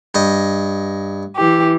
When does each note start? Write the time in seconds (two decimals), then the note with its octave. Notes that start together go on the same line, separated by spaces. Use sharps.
0.15 G2 D#5
1.36 E3 G4